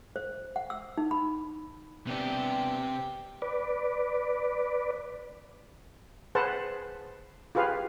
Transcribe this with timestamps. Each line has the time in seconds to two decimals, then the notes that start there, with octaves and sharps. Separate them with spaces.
0.16 C5
0.56 F#5
0.70 E6
0.98 D#4
1.11 B5
2.07 C3 B3 C4 D4 G4
3.42 B4 D5
6.35 G#4 B4 C5 F#5 A5
7.55 F4 G4 G#4 B4 F5